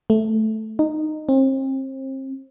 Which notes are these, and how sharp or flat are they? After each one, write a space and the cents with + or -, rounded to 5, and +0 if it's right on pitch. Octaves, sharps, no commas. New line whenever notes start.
A3 -5
D#4 -15
C4 +35